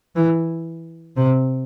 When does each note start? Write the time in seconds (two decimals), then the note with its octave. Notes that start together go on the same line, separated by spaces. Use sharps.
0.16 E3
1.17 C3